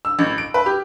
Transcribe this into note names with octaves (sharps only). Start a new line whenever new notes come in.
E6
A1
D7
B4
G4